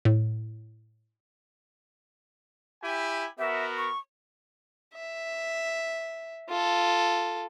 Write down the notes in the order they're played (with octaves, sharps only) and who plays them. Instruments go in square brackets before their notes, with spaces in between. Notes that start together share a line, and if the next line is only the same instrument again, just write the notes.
[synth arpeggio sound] A2
[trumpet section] E4 G4 G#5
[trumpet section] B3 F#4 A#4 [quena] E5
[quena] C#6
[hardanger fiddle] E5
F4 A4